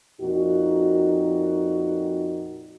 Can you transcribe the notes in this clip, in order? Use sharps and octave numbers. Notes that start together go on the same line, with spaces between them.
F2 A#2 D#4 F#4